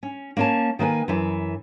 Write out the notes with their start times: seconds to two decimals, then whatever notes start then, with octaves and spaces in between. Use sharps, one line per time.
0.03 C#4
0.37 A#3 C#4 A5
0.79 D#3 A#3 B4 G#5
1.08 F#2 E3